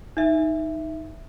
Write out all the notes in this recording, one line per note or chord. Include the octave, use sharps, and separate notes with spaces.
D#4 E5